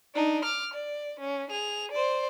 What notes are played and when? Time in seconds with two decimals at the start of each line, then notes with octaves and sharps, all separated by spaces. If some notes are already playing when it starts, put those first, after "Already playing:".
0.15 D4 D#4
0.45 D6 F6
0.74 D5
1.20 C#4
1.51 G#4 F7
1.92 C5 D5